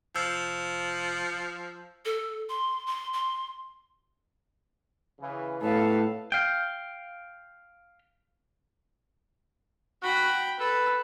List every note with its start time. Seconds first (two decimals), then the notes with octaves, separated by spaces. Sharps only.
0.16 F1 F3 E6 G6
2.05 A4
2.49 C6
2.87 C6
3.13 C6
5.20 C#3 E3
5.62 C#2 A2 B3 A4 B4 F5
6.32 F5 G5
10.03 F#4 G5 B5
10.59 A4 B4